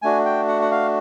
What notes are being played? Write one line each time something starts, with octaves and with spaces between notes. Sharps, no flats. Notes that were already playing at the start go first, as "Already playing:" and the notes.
A3 D4 F#4 G#5
G5
F#5
F#5
F5